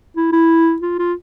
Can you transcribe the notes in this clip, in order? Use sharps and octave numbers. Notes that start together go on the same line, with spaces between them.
E4
E4
F4
F4